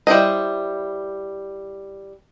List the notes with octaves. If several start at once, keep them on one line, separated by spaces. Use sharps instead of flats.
G3 E4 C5 D#5